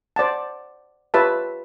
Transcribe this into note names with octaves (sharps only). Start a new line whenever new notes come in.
C5 D5 F#5 A5
F4 G4 B4 C#5 E5 A5